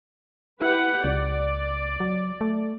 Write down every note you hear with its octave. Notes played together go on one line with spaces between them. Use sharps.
E4 G4 B4 F#5
C#2 D5
F#3
A3